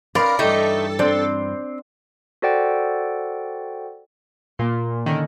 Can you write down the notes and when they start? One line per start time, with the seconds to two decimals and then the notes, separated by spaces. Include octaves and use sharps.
0.15 C#4 D#4 A#4 B4 D5 F5
0.39 G2 E3 A3 D#4 G4 A4
0.99 C4 D4
2.42 F#4 A4 C5 D5 F#5 G5
4.59 A#2 A#3 C6
5.06 D3 D#3 C#4 D#5